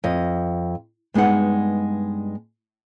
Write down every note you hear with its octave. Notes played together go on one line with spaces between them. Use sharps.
F2 D#5
G2 G#3 B3 D#4 F#5